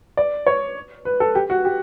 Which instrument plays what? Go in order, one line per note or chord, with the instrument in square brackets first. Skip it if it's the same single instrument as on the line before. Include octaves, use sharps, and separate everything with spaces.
[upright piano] D5
C#5
B4
A4
G4
F#4
G4